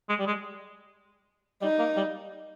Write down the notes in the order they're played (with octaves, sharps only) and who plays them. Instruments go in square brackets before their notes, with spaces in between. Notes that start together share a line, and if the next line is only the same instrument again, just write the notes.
[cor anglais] G#3
G3
G#3
[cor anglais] G3 [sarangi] D#4
[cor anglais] A#3
G3